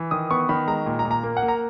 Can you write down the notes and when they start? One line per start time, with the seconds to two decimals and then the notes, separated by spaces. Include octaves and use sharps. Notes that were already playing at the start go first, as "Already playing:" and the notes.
Already playing: E3
0.11 D#3 D#6
0.31 B3 C#6
0.49 D#3 B5
0.67 G#3 A#5
0.86 A#2
0.99 A#5
1.05 A#2
1.11 A#5
1.23 A#3
1.37 F#5
1.42 A#3
1.48 A#5